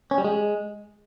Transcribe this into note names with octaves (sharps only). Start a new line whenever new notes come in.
C#4
G3
G#3